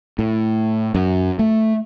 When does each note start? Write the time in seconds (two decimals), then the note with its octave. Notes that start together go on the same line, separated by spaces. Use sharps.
0.19 A2
0.95 F#2
1.39 A3